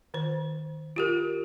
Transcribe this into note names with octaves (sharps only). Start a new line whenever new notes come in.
D#3 C5
F4 G4 A#4